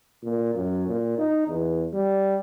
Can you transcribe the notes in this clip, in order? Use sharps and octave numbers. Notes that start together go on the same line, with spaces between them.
A#2
F#2
A#2
D#4
E2
G3